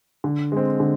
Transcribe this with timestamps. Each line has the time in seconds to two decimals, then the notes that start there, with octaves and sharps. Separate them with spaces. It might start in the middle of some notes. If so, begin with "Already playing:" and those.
0.24 D3
0.52 G#3 C4
0.80 D3